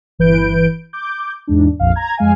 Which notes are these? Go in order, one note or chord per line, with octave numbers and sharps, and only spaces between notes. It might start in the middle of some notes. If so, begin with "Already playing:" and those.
G1 E3 B4 G6 D7
D6 G6
E2 G#2 D4
A#1 F2 F5
A#5 G#6
F2 G#3 F5 G#5